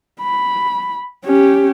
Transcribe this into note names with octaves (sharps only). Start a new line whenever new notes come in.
B5
C#4 G4